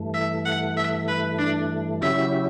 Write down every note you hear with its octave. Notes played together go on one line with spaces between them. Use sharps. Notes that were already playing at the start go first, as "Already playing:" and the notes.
Already playing: G2 E3 A3
E5
F#5
E5
B4
D4
C#3 F#3 C#4 E4 G4 E5